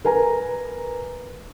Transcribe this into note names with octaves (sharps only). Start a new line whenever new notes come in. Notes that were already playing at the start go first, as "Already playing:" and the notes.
A#4 B4 G#5 A#5